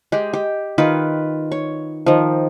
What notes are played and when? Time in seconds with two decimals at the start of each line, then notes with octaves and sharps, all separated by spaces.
0.12 G#3 G4
0.33 G4
0.78 D#3 F4 B4
1.52 C#5
2.06 D#3 F3